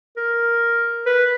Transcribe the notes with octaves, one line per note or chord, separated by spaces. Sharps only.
A#4
B4